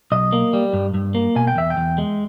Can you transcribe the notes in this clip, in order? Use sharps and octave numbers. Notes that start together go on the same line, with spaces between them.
B1 D#5
A#3
G3
G2
G2
A#3
B2 G#5
G5
E2 E5
G5
E2
G#3